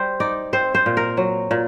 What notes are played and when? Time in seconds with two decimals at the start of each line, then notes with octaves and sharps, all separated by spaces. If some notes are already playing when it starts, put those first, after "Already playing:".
Already playing: G3 C5
0.20 D#4 D5
0.53 C4 C5
0.75 C5
0.86 A#2
0.97 A#4
1.17 F#3
1.51 A#2